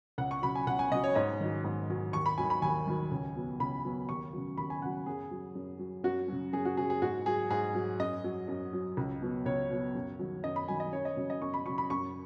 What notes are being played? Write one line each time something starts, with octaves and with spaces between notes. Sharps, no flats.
C#2 F#5
C#6
C#3 F#3 B5
G#5
C#2 F#5
G#5
C#3 F#3 D#5
C#5
G#2 D#5
D#3 F#3
G#2
D#3 F#3
D#2 C#6
B5
D#3 F#3 G#5
B5
D#2 G#5
D#3 F#3
C#2
B2 F#3
C#2 B5
B2 F#3
D#2 C#6
C#3 F#3
D#2 B5
G#5
C#3 F#3 F#5
F#2 G#4
F#3
F#2
F#3
F#2 F#4
C#3 F#3
F#2 G#4
F#4
C#3 F#3 G#4
G#4
G#2 F#4
F#3 G#4
G#2 G#4
F#3
F#2 D#5
F#3
F#2
F#3
C#2
B2 F#3
C#2 C#5
B2 F#3
F#2
D#3 F#3
F#2 D#5
B5
D#3 F#3 G#5
D#5
F#2 C#5
D#5
C#3 F#3
D#5
F#2 C#6
B5
C#3 F#3 C#6
B5
F#2 C#6